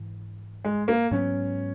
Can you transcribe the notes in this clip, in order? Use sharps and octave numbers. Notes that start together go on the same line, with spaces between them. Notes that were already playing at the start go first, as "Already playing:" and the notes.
Already playing: G#2 E3
G#3
A#3
G#2 F#3 B3 C#4